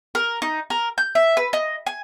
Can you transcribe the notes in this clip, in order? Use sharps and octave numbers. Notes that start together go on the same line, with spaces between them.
A#4
D#4
A#4
G6
E5
B4
D#5
G#5